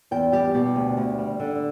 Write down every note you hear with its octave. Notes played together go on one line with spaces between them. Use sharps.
E2 G5
G3 G4
B2 G4
D2
D2
G3
D3